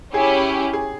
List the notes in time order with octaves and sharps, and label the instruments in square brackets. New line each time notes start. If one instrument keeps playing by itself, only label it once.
[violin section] C#4 E4 G4 [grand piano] G#4
[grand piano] G#4